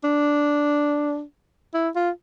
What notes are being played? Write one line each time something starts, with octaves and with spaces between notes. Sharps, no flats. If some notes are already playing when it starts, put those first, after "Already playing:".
D4
E4
F4